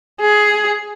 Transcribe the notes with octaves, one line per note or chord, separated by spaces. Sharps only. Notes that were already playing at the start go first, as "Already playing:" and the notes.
G#4